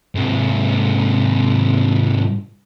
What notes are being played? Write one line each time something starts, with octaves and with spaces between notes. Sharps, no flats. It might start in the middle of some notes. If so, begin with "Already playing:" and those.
G#2 C3